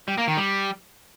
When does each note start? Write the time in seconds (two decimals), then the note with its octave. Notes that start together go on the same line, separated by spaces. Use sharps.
0.08 G3
0.18 A#3
0.27 D#3
0.37 G3